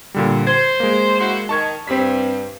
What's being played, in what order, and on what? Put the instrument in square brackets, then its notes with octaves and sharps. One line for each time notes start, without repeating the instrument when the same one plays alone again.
[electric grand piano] A#2 D3 G3
[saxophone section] C5 [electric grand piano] G#6
[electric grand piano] G#3 A#3
[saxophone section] E4 F#4 C5
[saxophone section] D#3 [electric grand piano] A5 C#6 G#6
[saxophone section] G2 [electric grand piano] C4 B6